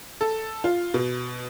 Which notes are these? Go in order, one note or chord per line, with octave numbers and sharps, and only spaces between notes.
A4
F4
B2